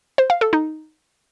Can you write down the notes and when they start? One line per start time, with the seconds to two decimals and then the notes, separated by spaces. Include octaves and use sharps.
0.18 C5
0.30 F5
0.41 A4
0.53 D#4